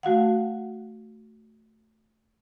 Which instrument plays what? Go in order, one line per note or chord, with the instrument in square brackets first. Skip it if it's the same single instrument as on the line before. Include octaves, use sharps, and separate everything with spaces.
[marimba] A3 F#4 F5 F#5